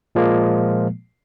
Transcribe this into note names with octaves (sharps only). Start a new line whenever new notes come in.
A#2 F3 G#3 A#3